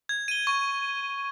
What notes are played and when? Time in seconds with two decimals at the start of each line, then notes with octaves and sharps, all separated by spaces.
0.09 G#6
0.28 D#7 G7
0.47 C#6